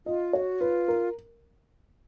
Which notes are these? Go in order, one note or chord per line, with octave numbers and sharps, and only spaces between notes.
F4 D#5
F#4 C#5
F4 B4
A#4